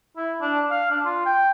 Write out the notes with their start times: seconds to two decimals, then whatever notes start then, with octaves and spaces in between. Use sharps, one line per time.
0.17 E4
0.41 D4
0.71 F5
0.91 D4
1.05 F4
1.26 G5